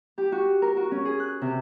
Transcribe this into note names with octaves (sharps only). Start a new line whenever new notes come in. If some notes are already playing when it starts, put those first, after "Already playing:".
G4
F#4
A#4
F#4
C#4
G#4
F#6
C3